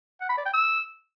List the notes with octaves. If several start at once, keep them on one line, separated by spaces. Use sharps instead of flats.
F#5
B5
D5
G5
E6